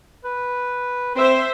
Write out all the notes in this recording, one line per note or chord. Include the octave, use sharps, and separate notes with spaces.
B4
C4 C5 E5